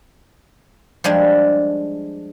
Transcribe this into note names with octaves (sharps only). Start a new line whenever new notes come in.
F3 G3 G#3 D4